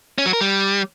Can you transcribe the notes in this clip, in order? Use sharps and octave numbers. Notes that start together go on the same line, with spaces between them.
C#4
F#3
A#4
G3